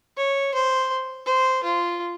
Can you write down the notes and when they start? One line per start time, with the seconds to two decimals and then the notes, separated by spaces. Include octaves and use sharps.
0.17 C#5
0.54 C5
1.26 C5
1.63 F4